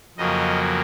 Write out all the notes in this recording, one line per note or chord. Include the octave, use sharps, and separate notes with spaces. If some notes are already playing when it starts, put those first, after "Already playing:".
F2 C#3 F#3 A#3 D#5